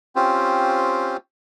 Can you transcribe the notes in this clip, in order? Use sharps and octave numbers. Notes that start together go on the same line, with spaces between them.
C4 C#4 F4 G4 C5